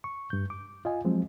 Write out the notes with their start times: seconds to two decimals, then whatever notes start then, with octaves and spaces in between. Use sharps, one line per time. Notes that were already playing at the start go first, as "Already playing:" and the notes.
0.04 C#6
0.30 G2 G6
0.50 D6
0.85 F4 D#5 G#5
1.05 F3 F#3 G#3 C4